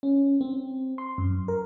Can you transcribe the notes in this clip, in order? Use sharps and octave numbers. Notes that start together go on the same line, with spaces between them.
C#4
C4
C6
F#2
A#4